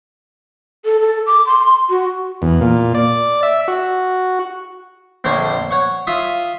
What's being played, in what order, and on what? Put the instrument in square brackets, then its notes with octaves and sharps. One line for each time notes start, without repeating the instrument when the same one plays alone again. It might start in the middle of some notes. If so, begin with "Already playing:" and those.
[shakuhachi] A4
A4
D6
C6
F#4
[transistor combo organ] E2
A#2
D5
E5
F#4
[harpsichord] A#1 F2 D3 C5 C#5
C#5 F#5 C#6
F4 E5 D#6